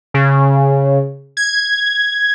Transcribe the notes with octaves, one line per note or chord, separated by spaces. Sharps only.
C#3
G#6